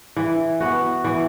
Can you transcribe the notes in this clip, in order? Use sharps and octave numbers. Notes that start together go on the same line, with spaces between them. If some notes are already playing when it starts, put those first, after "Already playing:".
E3
B3 F#4
E3